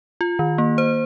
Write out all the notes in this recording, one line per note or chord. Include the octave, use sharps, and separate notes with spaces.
F4
D#3
A#3
C5